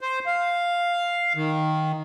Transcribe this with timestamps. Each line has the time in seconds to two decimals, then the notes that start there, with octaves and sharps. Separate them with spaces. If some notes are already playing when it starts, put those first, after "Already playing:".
0.01 C5
0.26 F5
1.35 D#3